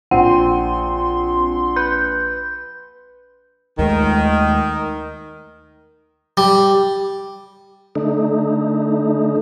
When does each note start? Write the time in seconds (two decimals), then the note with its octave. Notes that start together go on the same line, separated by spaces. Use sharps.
0.11 A#1 C4 F#5 C6
1.76 B4 G6
3.79 D#2 D#3 G#3 A3
6.37 G3
7.95 D3 A3 D#4